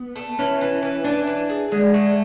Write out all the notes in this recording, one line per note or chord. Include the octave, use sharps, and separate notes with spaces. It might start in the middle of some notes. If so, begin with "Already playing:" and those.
Already playing: B3
A3
E3 C#4
E3
E3
E3 D4
E3
G#4
D3 G#3
A3